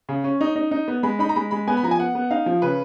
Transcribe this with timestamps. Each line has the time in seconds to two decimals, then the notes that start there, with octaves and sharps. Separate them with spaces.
0.09 C#3
0.24 C#4
0.41 D#4
0.56 D#4
0.71 D#4
0.88 B3
1.03 G#3 B5
1.19 D#4 B5
1.29 A#5
1.36 G#3 B5
1.51 G#3 B5
1.67 B3 G#5
1.77 B5
1.83 F3 A#5
1.91 G#5
1.99 B3 F#5
2.15 B3
2.31 D#4 F5
2.46 F3
2.62 C#3 B4